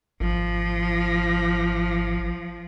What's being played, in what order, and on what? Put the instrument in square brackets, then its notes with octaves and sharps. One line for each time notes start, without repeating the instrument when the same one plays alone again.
[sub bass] G#1 [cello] F3